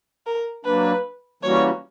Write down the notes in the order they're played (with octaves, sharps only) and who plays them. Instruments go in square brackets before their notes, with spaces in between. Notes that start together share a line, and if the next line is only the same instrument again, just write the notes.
[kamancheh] A#4
[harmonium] F#3 A#3 D4 [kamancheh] B4
[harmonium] E3 G3 A#3 C#4 F#4 [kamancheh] C#5